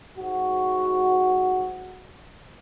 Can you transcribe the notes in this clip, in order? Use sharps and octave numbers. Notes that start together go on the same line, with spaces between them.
G#2 F#4